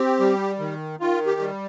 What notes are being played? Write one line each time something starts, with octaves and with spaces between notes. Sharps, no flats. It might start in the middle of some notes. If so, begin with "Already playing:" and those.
Already playing: C4 G4
G3
D#3
D#3 F4
G4
G3